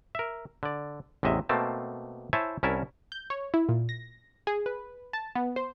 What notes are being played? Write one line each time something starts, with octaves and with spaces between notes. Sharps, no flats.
A#4 E5
D3 D5
A1 E2 C3 D#5 E5
B2 A3 A#3 C4 A5
E4 C5 C#5 E5 G#5 A5
C2 C#4 E4 A#4 E5 A5
G6
C#5
E4
A#2
A#6
G#4
B4
A5
B3
C5